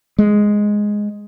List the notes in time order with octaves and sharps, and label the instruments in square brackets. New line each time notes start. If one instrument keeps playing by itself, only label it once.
[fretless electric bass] G#3